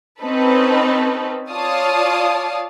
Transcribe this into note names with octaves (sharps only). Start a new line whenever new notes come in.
C4 C#4 D#4 A4 B4
F4 C#5 D5 F5 A5 D#6